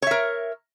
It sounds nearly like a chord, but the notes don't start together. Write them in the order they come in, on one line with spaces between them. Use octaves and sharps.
C#5 E5 A#4